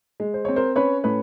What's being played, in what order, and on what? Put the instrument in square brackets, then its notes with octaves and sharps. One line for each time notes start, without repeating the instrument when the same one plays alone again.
[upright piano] G#3
C5
C4 C#5
A#4 C5
C#4 B4 C#5
A2 B4 C#5